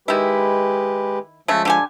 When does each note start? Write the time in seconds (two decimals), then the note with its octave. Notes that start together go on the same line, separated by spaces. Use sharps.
0.08 D#3 G#3 E4 G4 B4
1.48 C#3 F3 G#3 A3
1.65 D3 G4 G#5